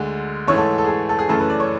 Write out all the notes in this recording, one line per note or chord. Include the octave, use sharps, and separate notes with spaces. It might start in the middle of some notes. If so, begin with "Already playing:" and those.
Already playing: D2 D3 G#3
G#2 E3 A3 C#5
A4
A4
G#4
A4
A4
G#4
F#2 C#3 E3 A3 A4
B4
D5
C#5